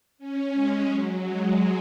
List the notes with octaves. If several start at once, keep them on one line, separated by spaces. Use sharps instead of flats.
C#4
G#3
F#3
G#3